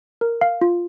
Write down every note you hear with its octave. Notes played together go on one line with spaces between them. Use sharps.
A#4
F5
F4